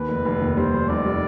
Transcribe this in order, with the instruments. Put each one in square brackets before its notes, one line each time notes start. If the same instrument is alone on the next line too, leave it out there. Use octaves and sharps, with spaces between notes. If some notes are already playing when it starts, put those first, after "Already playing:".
Already playing: [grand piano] D#2 [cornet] B4
[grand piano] F1
F1
D#2
[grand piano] G3 [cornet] C5
[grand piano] F1
[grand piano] F1 [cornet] D5
[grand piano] G3